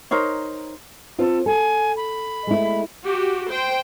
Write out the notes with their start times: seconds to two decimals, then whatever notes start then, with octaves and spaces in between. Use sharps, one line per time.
0.11 D#4 A#4 C5 C#5
1.18 C4 F4 A4 C5
1.46 A4 G#5
1.96 B5
2.47 G#3 A3 E4
3.03 F#4 G4
3.48 C5 G5